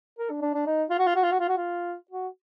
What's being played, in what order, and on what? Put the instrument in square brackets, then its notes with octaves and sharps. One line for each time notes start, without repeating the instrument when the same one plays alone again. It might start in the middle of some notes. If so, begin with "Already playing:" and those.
[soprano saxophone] A#4
D4
D4
D4
D#4
F4
F#4
F4
F#4
F4
F#4
F4
F#4
F4
F#4